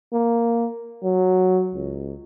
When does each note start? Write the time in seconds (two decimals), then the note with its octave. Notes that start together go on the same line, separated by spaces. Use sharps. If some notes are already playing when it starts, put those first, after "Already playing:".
0.13 A#3
1.03 F#3
1.74 C#2